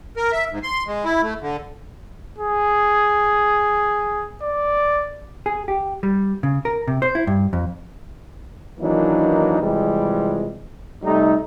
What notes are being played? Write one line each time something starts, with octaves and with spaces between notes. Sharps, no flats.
A#4
E5
G#2
C6
G#3
E4
A3
D3
G#4
D5
G#4
G4
G3
C#3
A#4
C3
C5
E4
G2
F2
D#3 E3 F#3 A#3 D4 D#4
C3 E3 F3 G3 G#3
C3 G3 A3 D#4